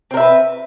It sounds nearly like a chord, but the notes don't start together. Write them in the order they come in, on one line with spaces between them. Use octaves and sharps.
C4 A#4 E5 B4